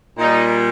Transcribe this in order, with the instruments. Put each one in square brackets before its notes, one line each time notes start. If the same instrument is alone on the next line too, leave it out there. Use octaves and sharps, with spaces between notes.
[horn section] A#2 G3 D#4